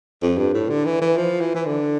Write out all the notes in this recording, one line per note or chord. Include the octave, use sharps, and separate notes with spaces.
F2
G2
A2
D3
E3
E3
F3
E3
E3
D3